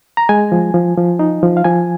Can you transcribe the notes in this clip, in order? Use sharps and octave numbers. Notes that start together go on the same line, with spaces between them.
A#5
G#3 G#5
F3
F3
F3
D#4
F3
F5
F3 G#5